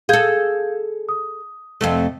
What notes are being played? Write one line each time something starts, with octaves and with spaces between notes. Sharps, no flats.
G#4 A4 F5 G6 G#6
D#6
F2 C3 A3